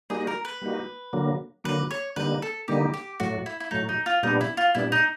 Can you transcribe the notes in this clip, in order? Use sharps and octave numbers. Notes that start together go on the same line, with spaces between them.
G3 A#3 D#4 F#4 G#4
A#4
B4
G3 A#3 D#4 F#4
D3 F#3 A#3
D3 F#3 A#3 B4
C#5
D3 G3 A#3 D#4 B4
A4
D3 G3 A#3 D#4 G4
G4
A2 F#3 A3 F#4
E4
E4
A2 F#3 A3 D#4
D#4
F4
A#2 G3 B3 D4 D#4
E4
F4
A#2 G3 B3 D4 E4
D#4